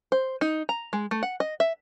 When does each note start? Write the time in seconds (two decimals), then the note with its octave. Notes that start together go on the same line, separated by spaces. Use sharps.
0.12 C5
0.41 D#4
0.69 A#5
0.93 G#3
1.11 A3
1.23 F#5
1.40 D#5
1.60 E5